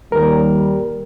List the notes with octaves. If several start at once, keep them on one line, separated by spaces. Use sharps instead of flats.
D#2 G3 A#4